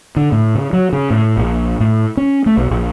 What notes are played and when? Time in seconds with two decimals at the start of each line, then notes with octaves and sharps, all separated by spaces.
0.16 D3
0.32 A2
0.55 C#3
0.73 F#3
0.93 C#3
1.10 A2
1.37 A#1
1.80 A2
2.17 C#4
2.46 A3
2.57 B1
2.71 A#1